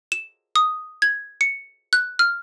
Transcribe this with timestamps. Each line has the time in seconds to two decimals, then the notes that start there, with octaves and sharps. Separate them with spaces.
0.12 E7
0.56 D#6
1.02 G#6
1.41 C#7
1.93 F#6
2.19 F6